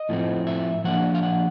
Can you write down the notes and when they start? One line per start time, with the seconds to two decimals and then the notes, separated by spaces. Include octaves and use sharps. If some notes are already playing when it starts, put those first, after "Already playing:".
Already playing: D#5
0.09 A2 F3 A3 C4
0.47 E5
0.84 F3 A#3 D4 F#5
1.15 F5
1.23 F#5